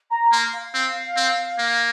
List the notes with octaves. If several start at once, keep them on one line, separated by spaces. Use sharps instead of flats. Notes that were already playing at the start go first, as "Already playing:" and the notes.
A#5
A#3 C6
F5
C4
C4
A#3